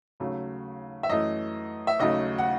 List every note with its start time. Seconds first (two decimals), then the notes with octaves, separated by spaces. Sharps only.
0.20 D#2 C#3 F#3 A3
1.03 E5
1.09 F#2 E3 A3 D#5
1.87 E5
1.99 D#2 C#3 F#3 A3 D#5
2.38 F#5